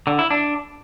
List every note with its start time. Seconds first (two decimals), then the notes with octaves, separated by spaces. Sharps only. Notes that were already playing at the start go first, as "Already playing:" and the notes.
0.07 D3
0.19 E4
0.31 D4